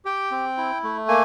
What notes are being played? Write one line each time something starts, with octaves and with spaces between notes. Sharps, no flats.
G4 G5
C4
E4
A3
A#3 G#5